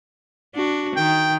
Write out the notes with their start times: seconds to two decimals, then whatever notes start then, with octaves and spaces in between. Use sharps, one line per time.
0.55 D4 F#4
0.96 D#3 G5